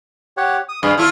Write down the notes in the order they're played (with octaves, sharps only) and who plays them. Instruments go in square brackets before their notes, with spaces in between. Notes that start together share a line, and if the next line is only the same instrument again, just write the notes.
[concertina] G4 C#5 F#5
D#6
[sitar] G2 [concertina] G#4 B4 F5
[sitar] E4 F4 [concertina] A4 C#6 F6